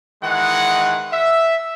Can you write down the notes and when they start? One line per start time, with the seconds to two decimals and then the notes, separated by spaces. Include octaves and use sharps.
0.24 D#3 E3 G#3 F#5
1.12 E5